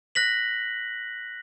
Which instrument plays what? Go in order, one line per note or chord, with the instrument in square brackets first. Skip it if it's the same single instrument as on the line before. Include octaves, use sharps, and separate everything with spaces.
[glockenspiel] F#6 A#6 B6 F#7